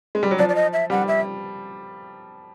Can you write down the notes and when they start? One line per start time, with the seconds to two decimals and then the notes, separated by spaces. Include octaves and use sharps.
0.15 G#3
0.23 G3
0.31 F#3
0.39 F3 D5
0.49 D5
0.55 D#5
0.73 E5
0.90 G3 F#5
1.08 E5